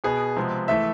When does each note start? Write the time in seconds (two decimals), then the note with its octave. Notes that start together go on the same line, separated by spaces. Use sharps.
0.04 B2 B3 G#4
0.36 C3 F3 G#3 B3
0.68 E3 A3 E5